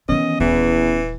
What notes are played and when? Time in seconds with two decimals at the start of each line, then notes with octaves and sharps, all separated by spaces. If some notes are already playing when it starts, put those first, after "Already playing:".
0.09 D#3 E3 B3 C#4 D#5
0.40 D#1 E2 E3